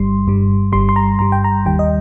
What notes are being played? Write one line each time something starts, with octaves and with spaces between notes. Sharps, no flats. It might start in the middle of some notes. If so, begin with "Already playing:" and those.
Already playing: G1 G2 G3 C6
G1 G2 G3
G1 G2 G3 C6
C6
A#5
G1 G2 G3 A#5
G5
A#5
D#2 D#3 G3 G5
D#5